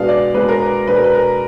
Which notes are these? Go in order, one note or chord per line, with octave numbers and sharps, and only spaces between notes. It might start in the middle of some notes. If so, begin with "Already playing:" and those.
Already playing: B2 G#3 B3 D4 F5
D5
B2 G#3 B3 D4 B4
A#4
B4
B2 G#3 D4 B4
A#4
B4
A#4